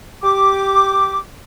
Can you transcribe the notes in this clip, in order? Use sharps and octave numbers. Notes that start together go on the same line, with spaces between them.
G4 D6